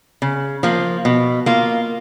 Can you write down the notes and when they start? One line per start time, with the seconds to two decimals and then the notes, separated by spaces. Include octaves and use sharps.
0.22 C#3
0.63 F3 A#3
1.05 B2
1.46 A#3 F4